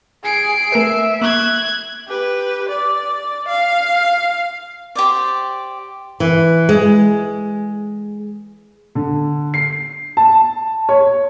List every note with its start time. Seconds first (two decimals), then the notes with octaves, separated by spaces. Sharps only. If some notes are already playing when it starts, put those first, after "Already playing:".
0.24 G#4 C7 D7
0.72 A3 A#4 B4 E5
1.21 A#3 C#6 F#6 G#6
2.08 G4 B4
2.69 D5
3.48 F5
4.95 G4 C5 D5
6.20 E3
6.69 G#3
8.95 D3
9.54 C7
10.17 A5
10.89 C#5